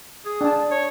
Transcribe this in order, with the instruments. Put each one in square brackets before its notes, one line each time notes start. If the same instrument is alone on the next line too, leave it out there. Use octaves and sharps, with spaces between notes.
[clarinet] G#4
[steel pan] D4 A5
[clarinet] C#5